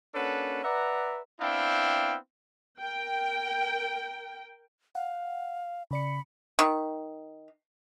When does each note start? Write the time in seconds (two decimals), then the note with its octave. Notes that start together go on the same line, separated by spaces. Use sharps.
0.15 A#3 C#4 D4 F#4 A4 B4
0.64 B4 D5 E5 F#5 A#5
1.41 B3 C4 D4 E4 F5 G5
2.81 A#4 G5
4.95 F5 F#5
5.91 C#3 D5 B5 C#7
6.59 D#3